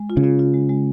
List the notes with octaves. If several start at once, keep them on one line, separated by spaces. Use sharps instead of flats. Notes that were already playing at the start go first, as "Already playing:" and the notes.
Already playing: G#3
F4
C#3
F4
F4
G#3
G#3